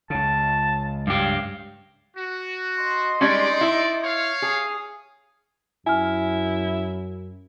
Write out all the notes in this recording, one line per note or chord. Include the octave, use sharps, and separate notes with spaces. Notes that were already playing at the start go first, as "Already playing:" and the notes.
C#2 C#3 A5
G2 G4 F5
F#4
D#5 C6
G3 G#3 C#4 D#4 D5
E4
C#5 F5
G#4 D#6
F#2 E4 G#5 F6